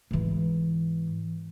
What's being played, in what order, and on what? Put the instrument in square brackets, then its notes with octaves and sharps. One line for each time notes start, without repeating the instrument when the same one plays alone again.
[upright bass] G#2 E3